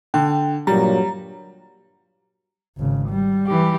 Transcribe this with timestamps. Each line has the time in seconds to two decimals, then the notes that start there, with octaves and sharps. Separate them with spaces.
0.14 D3 G5
0.67 G2 A#2 F#3 G3 A#5
2.78 G#1 C#3
3.09 G3
3.47 E3 G4